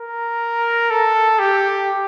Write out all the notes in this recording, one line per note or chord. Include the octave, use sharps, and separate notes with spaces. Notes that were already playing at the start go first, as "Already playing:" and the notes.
Already playing: A#4
A4
G4